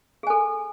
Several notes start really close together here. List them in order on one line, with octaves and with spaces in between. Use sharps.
G#4 G#5 A4